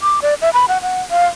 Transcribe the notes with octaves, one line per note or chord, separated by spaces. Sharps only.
D6
D5
E5
B5
F#5
F#5
F5